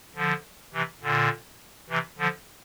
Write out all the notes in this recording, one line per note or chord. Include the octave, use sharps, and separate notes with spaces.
D3 F3
C3 E3
A#2 D3
C3 E3
D3 F3